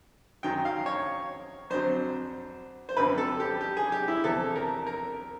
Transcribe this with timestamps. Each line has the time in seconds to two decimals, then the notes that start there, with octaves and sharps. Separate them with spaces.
0.43 F#2 D#3 F#3 G5
0.65 F5
0.86 C#5
1.70 F2 D3 F#3 C5
2.89 C5
2.97 G#1 F#2 D3 F3 B4
3.18 A4
3.40 G4
3.61 G4
3.77 G#4
3.92 G4
4.08 E4
4.23 E2 C3 F3 A4
4.56 A#4
4.87 A#4